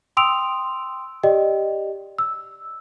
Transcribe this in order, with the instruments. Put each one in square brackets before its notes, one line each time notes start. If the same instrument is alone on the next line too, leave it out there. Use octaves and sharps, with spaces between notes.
[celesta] G5 C6 D#6 E6 D7 F7
G4 D5 D#5 G5
E6